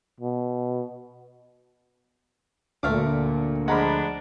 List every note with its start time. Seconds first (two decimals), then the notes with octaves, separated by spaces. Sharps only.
0.21 B2
2.83 D2 A#2 A3 F5 D6
3.68 F3 G#3 D4 F#5 A#5 B5